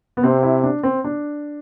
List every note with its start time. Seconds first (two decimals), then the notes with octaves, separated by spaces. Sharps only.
0.17 B3
0.23 C3 C4
0.43 E4
0.63 D4
0.83 C4
1.04 D4